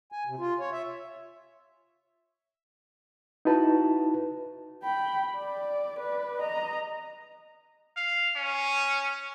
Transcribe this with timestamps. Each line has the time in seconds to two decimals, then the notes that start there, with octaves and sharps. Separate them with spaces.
0.12 G#5
0.26 C3
0.39 F4
0.60 C#5
0.73 E5
3.45 D#4 E4 F#4 B4 A5
4.83 G5 B5
5.37 D5
5.99 B4 D5
6.40 D#5 A#5
7.97 F5
8.36 C#4